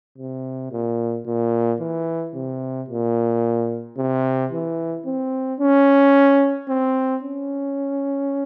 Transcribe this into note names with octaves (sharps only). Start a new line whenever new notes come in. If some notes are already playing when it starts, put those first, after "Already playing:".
C3
A#2
A#2
E3
C3
A#2
C3
E3
C4
C#4
C4
C#4